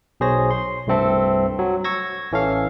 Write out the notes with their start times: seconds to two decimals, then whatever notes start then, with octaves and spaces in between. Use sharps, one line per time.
0.20 B1 B2 G#4 C5 C#5 A#6
0.51 C6
0.87 C2 G2 A3 C4 A4 E5
1.59 F#3
1.84 C#6 E6 G#6 A#6
2.32 A1 E3 C#4 A4 F5